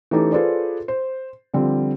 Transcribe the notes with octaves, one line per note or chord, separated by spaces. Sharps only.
E3 A3 C#4 D#4 G4 A4
F4 G#4 A4 B4 C5 D5
C5
D3 F3 G3 C4